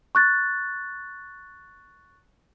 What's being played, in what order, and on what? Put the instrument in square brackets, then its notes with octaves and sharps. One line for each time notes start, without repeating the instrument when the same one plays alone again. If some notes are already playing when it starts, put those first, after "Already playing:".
[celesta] C#6 F#6 A6